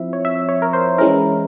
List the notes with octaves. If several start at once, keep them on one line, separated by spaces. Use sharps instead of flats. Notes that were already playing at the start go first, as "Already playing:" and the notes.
Already playing: F3 C4 E4 E5
C#5
E5
C#5
A#4
C5
E3 G#3 C#4 E4 A#4